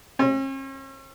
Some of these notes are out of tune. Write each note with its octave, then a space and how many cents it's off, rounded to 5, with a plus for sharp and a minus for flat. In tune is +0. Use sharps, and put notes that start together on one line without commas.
C#4 -45